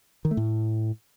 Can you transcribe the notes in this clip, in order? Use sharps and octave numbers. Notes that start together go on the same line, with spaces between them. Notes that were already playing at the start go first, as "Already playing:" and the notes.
D#3
A3
A2